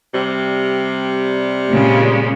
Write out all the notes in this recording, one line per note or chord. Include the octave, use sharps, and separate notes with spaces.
C3 G3
A#2 C#3 G#3